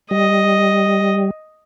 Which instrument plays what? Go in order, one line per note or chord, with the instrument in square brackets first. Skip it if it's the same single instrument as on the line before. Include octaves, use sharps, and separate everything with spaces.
[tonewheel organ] G3 [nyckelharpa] D#5